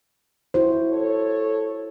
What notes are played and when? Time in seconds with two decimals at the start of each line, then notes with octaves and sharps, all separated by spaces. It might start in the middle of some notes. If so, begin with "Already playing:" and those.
0.54 E4 F#4 C5
0.90 A4 C#5